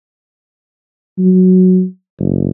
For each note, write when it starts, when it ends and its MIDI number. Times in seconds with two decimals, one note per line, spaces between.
1.19 1.84 54
2.19 2.50 30